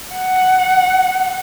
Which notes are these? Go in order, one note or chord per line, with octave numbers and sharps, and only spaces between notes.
F#5